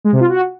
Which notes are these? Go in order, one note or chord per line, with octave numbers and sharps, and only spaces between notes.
G#3
C3
F4
F#4